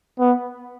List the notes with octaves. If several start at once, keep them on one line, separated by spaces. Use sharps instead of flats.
B3